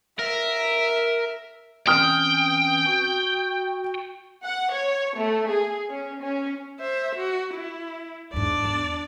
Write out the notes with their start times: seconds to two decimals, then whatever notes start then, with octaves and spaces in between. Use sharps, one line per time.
0.19 A#4 E5
1.87 E3 C4 C#4 G5 D#6 F6
2.86 F#4
4.44 F#5
4.73 C#5
5.18 A3
5.51 G#4
5.90 C#4
6.21 C#4
6.80 C5 E5
7.16 F#4
7.54 E4
8.33 E2 G#2 D4 D5
8.65 E2